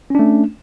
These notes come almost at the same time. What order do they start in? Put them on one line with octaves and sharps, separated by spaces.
C#4 D4 A3